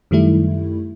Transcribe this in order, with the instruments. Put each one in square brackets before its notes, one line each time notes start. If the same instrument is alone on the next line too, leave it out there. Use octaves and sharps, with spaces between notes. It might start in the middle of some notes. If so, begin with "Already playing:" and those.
[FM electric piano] F#2 D#3 G3 A3 E4